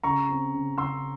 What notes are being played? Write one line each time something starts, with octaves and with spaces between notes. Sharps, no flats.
C#3 A#5 C#6
C4
C#3
C#3 C6 E6